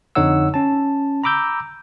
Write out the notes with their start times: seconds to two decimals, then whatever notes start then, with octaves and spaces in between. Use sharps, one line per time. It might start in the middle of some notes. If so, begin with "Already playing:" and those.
0.15 F2 D3 D#4 C#5 F#5 E6
0.54 C#4 A5
1.24 A#5 B5 D6 E6 G6